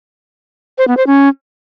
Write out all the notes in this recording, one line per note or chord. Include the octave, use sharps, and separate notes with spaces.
C5
B3
C5
C#4